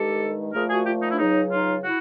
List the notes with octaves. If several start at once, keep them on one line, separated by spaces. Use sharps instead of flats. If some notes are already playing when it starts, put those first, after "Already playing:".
Already playing: G2 D#3 G#3 G4 A4
A#2 F3 A3 G#4 A#4
F#4 G#4
F4 G4
D#4
D4 E4
C#2 C#3 F#3 D#4
D#4 F4
E4 F#4